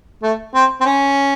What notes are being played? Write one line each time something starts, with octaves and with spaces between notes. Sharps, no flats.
A3
C4
C4
C#4